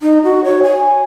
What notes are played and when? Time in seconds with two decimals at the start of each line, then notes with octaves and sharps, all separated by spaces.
0.01 D#4
0.24 F#4
0.44 C#5
0.63 G#5